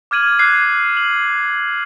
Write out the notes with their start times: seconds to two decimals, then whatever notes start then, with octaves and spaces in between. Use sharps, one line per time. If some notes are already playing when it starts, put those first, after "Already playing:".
0.11 D6 F6 G#6 D#7 F#7
0.39 D6 F#6 G#6 C7
0.97 F#7